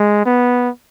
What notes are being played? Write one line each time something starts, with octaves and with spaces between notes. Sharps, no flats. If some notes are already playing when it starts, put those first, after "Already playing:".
Already playing: G#3
B3